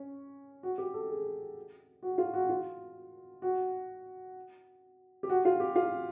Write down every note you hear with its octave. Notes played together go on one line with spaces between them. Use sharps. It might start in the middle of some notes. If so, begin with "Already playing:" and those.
Already playing: C#4
F#4
G4
A4
G#4
F#4
F4
F#4
F4
F#4
G4
F#4
F4
G4
F4